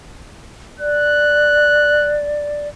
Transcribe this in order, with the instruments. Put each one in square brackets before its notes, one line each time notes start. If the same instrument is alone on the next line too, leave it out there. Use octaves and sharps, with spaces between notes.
[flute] D5 [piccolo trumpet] F#6